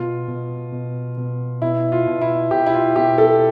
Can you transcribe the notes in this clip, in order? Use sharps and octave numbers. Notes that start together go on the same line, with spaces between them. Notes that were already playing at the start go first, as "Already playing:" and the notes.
Already playing: B2 F4
B2
B2
B2
B2 E4
F4
B2
E4
B2 G4
E4
F4
B2 G4
A4